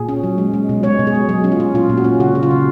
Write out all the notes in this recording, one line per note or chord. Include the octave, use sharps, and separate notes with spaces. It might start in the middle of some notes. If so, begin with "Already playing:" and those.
Already playing: A#2 G#4
C#4
F#3
G#3
G#3
B2
G#3 C#5
B2
G#4
G#3
F#3 G#4
C#4
F4
C#4
A#2 F4
A#2
F#4
C#4
C#3 F#4
C#3
F4
C#3